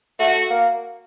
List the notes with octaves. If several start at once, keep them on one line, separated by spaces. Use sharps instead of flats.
A3 F#4
A#3